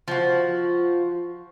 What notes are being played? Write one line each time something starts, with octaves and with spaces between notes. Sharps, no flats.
F3 F#4